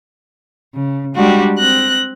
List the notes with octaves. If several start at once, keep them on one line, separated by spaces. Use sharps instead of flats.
C#3
G3 G#3 D4 F#4 G4
C4 F#6 A#6